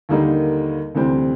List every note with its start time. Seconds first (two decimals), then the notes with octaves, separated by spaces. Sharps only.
0.09 D#2 D3 G3 A#3 D#4
0.95 D2 C3 E3 G3 C4